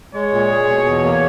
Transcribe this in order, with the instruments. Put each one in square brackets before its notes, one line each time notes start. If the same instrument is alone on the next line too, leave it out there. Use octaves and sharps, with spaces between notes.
[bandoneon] G#3 [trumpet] C#5
[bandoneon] A#2
G#4
B2
E2
A#3